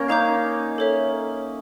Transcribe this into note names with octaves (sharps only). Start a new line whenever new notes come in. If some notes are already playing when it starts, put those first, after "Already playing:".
Already playing: A#3 C#4
D#4 F5 A#5 D6 G6
A4 C#5 E5